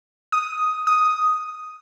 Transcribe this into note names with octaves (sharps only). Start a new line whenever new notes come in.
D#6
D#6